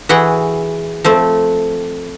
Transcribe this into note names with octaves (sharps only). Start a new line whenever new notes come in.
E3 F#4 G#4 F#5 G5
F3 A3 C4